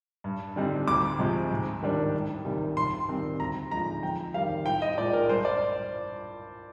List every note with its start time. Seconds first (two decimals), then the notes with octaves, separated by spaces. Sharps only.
0.24 G2
0.56 D3 G3 C4 D#4
0.87 D2 D6
1.19 C3 F3 G#3
1.50 G#2
1.82 D#3 G3 D4
2.14 C2
2.45 C3 D#3 G3
2.77 G2 C6
3.08 D#3 G3 C4
3.40 D2 A#5
3.71 D3 F3 G#3 D#4 A#5
4.03 F2 G5
4.34 D#3 G3 F5
4.66 C2 G5
4.82 D#5
4.98 A#2 G#3 D5
5.13 A#4
5.29 G2 C5
5.45 D5